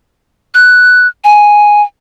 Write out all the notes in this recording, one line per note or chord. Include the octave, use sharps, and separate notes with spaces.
F#6
G#5